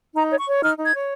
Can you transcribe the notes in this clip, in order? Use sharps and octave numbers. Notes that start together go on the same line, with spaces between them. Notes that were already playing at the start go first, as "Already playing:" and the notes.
D#4 A#5
C#5
C#6
C#5
D#4 F6
D#4
G#6
C#5